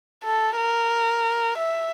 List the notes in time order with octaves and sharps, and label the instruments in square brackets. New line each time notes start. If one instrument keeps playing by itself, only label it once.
[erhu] A4
A#4
E5